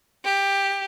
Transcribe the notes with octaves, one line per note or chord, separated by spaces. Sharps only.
G4